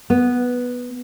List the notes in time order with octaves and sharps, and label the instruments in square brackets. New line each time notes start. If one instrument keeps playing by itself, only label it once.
[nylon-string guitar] B3